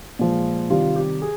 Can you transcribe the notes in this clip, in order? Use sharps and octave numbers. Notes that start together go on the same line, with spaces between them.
A#2 F3 G#3
C3 D#3 G3 F4
G4
G#4